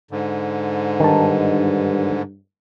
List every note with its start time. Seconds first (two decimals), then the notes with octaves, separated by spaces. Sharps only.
0.11 G#2 D3
1.00 G2 D#3 A5